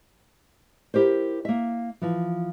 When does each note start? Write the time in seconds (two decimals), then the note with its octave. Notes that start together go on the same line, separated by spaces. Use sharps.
0.94 E4 G4 A#4 C5
1.45 A#3 E5
2.01 E3 F3